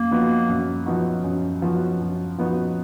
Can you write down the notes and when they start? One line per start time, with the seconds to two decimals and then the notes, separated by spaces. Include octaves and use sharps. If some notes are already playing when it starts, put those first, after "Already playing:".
Already playing: F#2 A#3
0.11 F3 B3 D#4 F#4
0.49 F#2
0.86 F3 B3 D#4 F#4
1.24 F#2
1.62 F3 B3 D#4 F#4
2.01 F#2
2.38 F3 B3 D#4 F#4